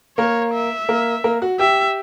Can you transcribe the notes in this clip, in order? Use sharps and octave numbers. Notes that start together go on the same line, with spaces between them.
A#3 A#4 C#5
E5
A#3 A#4
A#3 A#4
F#4 F#5
G4 E5 G5